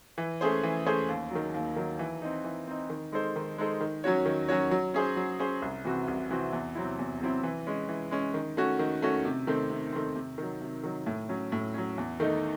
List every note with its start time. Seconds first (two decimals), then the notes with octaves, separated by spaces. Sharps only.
0.18 E3
0.41 A3 C#4 G#4 C5
0.63 E3
0.86 A3 C#4 G#4 C5
1.09 D#2
1.31 D#3 F#3
1.54 D#2
1.76 D#3 F#3
1.99 E3
2.22 C4 D#4
2.44 E3
2.68 C4 D#4
2.90 D#3
3.12 G#3 D#4 A4 C5
3.36 D#3
3.58 G#3 D#4 A4 C5
3.81 D#3
4.04 F#3 C#4 F#4 C#5
4.26 D#3
4.49 F#3 C#4 F#4 C#5
4.71 F#3
4.94 C#4 G#4 C5
5.16 F#3
5.40 C#4 G#4 C5
5.62 C2
5.85 C3 E3 C4 F#4
6.08 C2
6.30 C3 E3 C4 F#4
6.53 E2
6.75 C3 F#3 C4 E4
6.99 E2
7.21 C3 F#3 C4 E4
7.43 E3
7.67 G#3 C#4
7.89 E3
8.11 G#3 C#4
8.34 D#3
8.57 A3 C#4 F#4
8.79 D#3
9.02 A3 C#4 F#4
9.25 C3
9.47 D#3 A3 C4
9.70 C3
9.92 D#3 A3 C4
10.16 C3
10.38 D#3 F#3
10.61 C3
10.84 D#3 F#3
11.06 A2
11.29 F#3 C#4
11.52 A2
11.74 F#3 C#4
11.98 E2
12.20 D#3 A3 D#4